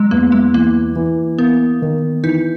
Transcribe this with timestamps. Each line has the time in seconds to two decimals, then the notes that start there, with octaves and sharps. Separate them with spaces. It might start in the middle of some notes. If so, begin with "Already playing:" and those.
Already playing: F#3 G#3
0.11 E2 A#3
0.32 G#3
0.54 E3 A#3
0.96 E3
1.39 A#3 B3
1.82 D#3
2.23 E3 D#4